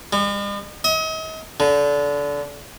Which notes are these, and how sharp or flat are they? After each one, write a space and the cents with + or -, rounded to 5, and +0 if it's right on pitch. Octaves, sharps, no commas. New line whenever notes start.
G#3 -45
D#5 +40
D3 -25